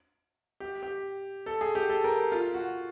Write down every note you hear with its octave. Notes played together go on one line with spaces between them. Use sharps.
G4
G4
A4
G#4
G4
A4
A#4
F4
F#4